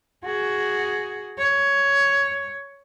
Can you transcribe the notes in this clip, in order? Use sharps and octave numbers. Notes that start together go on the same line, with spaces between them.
F#4 G#4
C#5